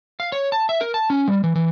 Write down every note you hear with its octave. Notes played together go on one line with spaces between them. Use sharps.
F5
C#5
A5
E5
A#4
A5
C#4
G3
E3
E3